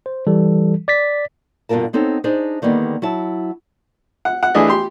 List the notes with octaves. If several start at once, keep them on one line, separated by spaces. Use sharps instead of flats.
C5
E3 G3 A4
D5 A6 B6
G2 B2 D3 F4 A#4 A5
B3 C4 D#4 A4 C#5
D4 D#4 G#4 C5
D3 D#3 G3 A#3 B3
F#3 E4 A5
F#5
F#5
E3 A3 D4 G#4 D#5
G4 C6